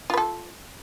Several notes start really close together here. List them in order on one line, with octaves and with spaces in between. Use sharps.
F4 B4 A4